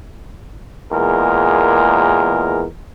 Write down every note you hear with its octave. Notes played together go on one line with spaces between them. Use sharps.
E2 A#2 G#3 A#4